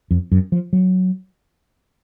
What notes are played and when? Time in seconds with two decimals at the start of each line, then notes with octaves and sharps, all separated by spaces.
0.11 F2
0.32 F#2
0.52 F3
0.73 F#3